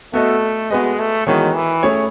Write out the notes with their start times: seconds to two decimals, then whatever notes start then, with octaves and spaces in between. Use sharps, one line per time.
0.14 A3 B3 F#4 A4 D#5
0.70 G#3 B3 F#4 B4 D#5
0.99 A3
1.27 D#3 E3 G#3 B3 F#4 C#5
1.55 E3
1.83 A3 C#4 G#4 C#5